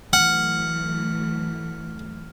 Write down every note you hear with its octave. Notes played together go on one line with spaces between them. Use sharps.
E3 F#3 A3 F#5 F6